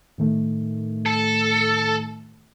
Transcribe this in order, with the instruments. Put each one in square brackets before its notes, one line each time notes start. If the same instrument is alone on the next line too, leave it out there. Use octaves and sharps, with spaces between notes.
[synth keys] A2 D#3 A3
[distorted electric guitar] A4